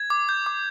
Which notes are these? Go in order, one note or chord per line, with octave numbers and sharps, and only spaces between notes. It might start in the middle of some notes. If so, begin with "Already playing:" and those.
Already playing: G#6
D6
G6
D6